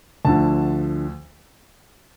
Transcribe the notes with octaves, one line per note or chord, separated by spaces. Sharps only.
D2 D3 F3 A5